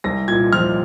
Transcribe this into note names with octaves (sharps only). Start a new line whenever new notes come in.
C2 A#6
A#2 G#6
F3 F6